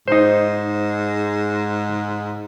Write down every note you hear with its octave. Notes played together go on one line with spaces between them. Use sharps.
G#2 D#4 C5